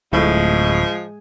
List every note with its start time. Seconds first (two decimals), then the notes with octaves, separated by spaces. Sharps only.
0.13 D1 A2 F3 G#3 A3